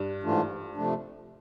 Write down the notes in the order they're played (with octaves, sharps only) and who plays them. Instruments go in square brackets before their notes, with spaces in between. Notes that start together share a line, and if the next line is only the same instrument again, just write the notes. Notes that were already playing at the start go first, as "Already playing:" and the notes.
Already playing: [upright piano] G2
[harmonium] G#2 E3 A3 D4 F4
C3 F3 A3 D4